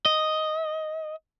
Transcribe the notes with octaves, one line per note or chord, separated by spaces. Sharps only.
D#5